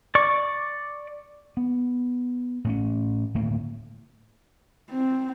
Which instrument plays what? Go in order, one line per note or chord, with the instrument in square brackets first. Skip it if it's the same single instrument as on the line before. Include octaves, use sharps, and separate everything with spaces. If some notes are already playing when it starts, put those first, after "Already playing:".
[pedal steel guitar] D5 C#6 D6
[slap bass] B3
A2 C4 C#4
D1 A2 A#3
[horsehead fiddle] C4